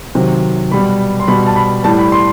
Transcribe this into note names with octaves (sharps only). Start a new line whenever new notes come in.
C3 D#3 F#3
B2 G3 B5
C6
B2 G3 B5
A5
B5
A2 G3 A5
B5
C6